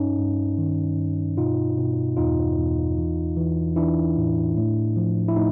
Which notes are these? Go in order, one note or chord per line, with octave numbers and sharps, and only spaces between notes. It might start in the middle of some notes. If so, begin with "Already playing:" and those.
Already playing: G2 C#4 D#4
G2
D#3
G2
B2 D#4 F4
B2
E2 D#4 F4
E2
E3
E3
E3 D4 E4
A2
A2
F3
E4
A2 D#4